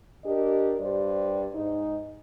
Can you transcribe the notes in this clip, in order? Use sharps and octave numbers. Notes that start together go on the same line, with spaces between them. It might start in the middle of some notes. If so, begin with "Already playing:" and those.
D4 G4 A#4 D#5
G2 G4 C5 D5
G#2 D#4